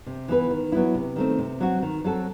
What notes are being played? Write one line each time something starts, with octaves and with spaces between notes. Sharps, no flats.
C3
E3 B3 E4 B4
D#3
F#3 B3 E4
C3
D#3 A3 C4
C3
F#3 C4 F#4
D#3
F#3 C4 F#4 A4